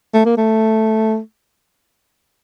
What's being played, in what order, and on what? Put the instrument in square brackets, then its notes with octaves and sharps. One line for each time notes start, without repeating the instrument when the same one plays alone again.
[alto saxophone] A3
A#3
A3